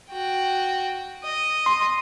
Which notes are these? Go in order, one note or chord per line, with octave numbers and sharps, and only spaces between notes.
F#4 G5
D#5
C6